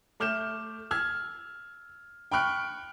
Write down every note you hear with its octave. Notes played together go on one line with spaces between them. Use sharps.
A3 D6 F6 G6 E7
E6 F6 G#6
G5 B5 C#6 F6 F#6 D7